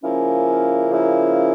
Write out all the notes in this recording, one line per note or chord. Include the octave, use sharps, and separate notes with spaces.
C#3 F3 A#3 C#4 E4
C#3 F3 A#3 C#4 E4